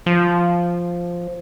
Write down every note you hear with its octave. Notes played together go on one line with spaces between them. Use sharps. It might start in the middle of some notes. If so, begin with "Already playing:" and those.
F3